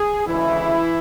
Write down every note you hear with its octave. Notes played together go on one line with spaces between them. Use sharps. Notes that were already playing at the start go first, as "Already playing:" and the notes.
Already playing: G#4
D2 C#3 E3 G#3 E4